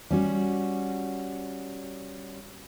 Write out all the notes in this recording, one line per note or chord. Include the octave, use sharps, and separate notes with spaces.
G3 C#4 F#4